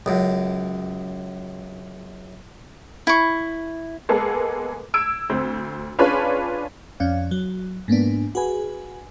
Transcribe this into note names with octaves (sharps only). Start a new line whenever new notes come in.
C#2 F#2
E4 C#6
G#3 A#3 B3 G#4 A4
E6 G#6 D7
D2 C4
C#4 D4 F4 G#4 B4 C#5
F2 C#4 D5 F5
F#3
G#2 A#3 B3 D4
F#4 G#4 B4 G#5